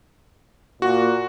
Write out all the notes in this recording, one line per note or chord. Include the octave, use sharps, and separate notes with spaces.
A#2 F#4